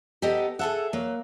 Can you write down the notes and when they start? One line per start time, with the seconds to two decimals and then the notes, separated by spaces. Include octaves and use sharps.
0.22 B3 D#4 G4 A4
0.59 G#4 A4 E5 F#5
0.93 F#3 A#3